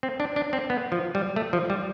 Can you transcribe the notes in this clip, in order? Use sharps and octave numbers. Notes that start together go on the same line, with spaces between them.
C4
D4
D4
C4
B3
F3
G3
A3
F3
G3